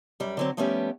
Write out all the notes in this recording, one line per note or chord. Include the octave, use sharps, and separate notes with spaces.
F#2 G3
D3 F#3 C4
F3 G3 A3 B3 C#4 G4